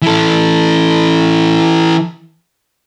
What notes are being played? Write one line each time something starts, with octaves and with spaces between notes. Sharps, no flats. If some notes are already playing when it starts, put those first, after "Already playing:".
E3 A4